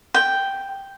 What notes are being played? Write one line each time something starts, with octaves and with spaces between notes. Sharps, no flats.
G5